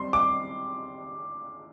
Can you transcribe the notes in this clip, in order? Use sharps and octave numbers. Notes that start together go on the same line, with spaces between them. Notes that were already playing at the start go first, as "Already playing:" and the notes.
Already playing: G3 C4 C6
D6